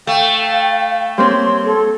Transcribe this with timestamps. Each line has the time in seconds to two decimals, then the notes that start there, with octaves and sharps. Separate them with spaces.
0.07 A3 F5 G5
1.18 G3 A#3 C4 C#5 C6
1.65 A4